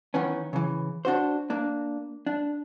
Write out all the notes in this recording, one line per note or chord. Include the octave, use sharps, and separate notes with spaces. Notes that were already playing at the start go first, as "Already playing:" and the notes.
D#3 E3 B3 C#4
C#3 E3
D4 F#4 C5
A#3 D4
D4